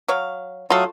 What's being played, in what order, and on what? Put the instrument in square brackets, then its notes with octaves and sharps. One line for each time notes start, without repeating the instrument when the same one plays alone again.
[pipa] F#3 C#5 F5
[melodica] F#3 F5 D#6 [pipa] A3 [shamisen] F4 A4